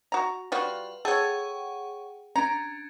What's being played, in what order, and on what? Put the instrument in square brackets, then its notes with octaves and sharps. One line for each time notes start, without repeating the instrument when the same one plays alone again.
[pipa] F#4 A#5
[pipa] G3 F4 F#4 [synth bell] B4 F5
[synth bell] G#4 F#5 G5 [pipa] A4 C#5
[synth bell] C#4 D4 [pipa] A#5